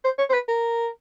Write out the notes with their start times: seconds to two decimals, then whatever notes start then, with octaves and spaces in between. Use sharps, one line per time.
0.05 C5
0.18 C#5
0.29 C5
0.34 B4
0.48 A#4